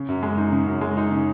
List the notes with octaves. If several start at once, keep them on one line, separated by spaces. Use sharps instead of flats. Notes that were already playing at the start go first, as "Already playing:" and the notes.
Already playing: C#3
F#2
G#3
D#4
C#3
F#2
G#3
D#4
C#3